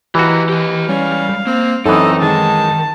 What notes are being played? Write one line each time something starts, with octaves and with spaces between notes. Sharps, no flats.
E3 F#4 G4 D#5 A#5
G4 D#5
G3 C#4 F5
A#3 C4
F#2 E3 C4 D#4 A4 D#5
D#3 G#3 A5